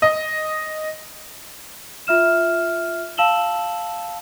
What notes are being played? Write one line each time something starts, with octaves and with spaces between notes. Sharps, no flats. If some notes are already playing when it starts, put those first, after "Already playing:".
D#5
F4 E5 F6 E7
F5 A5 E6 E7 F#7 G7